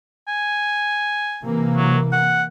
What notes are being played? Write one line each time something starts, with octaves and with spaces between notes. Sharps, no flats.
G#5
C3 E3 A#3
F#3
F#5